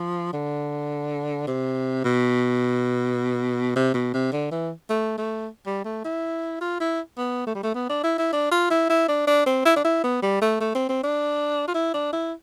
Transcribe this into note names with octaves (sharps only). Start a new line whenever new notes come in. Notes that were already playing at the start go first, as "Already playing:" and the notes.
Already playing: F3
D3
C3
B2
C3
B2
C3
D3
E3
A3
A3
G3
A3
E4
F4
E4
B3
A3
G3
A3
B3
D4
E4
E4
D4
F4
E4
E4
D4
D4
C4
E4
D4
E4
B3
G3
A3
A3
C4
C4
D4
F4
E4
D4
E4